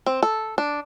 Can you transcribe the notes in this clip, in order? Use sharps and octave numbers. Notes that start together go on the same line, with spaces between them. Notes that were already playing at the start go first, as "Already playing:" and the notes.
C4
A4
D4